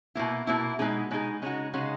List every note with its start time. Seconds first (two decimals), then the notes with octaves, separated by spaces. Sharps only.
0.15 B2 A#3 E4
0.47 B2 A#3 E4
0.79 B2 G#3 D#4 G#4
1.11 B2 G#3 D#4 G#4
1.42 C#3 G#3 D#4 F#4
1.74 C#3 G#3 D#4 F#4